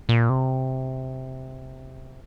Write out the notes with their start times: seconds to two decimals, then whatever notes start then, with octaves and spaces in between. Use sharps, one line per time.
0.09 A#2
0.30 C3